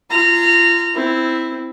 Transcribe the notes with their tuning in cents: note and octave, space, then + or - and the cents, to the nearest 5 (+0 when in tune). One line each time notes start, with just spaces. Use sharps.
F4 -30 A#5 -20
C4 +0 E4 +0